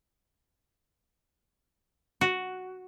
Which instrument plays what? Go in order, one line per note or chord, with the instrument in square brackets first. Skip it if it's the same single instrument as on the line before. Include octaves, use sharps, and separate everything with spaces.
[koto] F#4